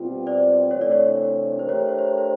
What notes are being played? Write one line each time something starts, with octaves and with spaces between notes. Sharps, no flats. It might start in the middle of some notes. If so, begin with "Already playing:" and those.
Already playing: B2 G3 C4 F4
C5 D5
C3 E3 A3 D4 C#5
D5
C#5
A3 D4 G4 A#4 C5
C#5
C5
C#5
C5
C#5
C5